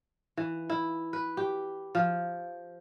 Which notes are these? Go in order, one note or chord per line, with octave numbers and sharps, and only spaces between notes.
E3
E4
B4
G4
F3